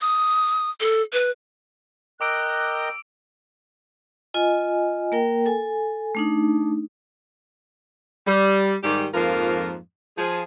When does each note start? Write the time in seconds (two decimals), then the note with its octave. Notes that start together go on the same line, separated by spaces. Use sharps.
0.01 D#6
0.80 A4
1.13 B4
2.21 A#4 D#5 G5 D6 E6 F#6 D7
4.34 F4 D#5 G#5
5.12 A#3 A#4 G5
5.46 A4 G#5
6.15 A3 D4 D#4
8.27 G3
8.83 G#2 D#3 G3 G4
9.14 F2 G#2 F3 A#3 F4 A#4
10.18 F3 G#4